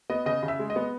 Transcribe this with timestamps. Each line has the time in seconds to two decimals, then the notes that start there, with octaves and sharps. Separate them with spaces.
0.10 B3 D#5
0.26 C#3 D#5
0.43 C#3
0.48 E5
0.59 G#3
0.70 D#5
0.76 B3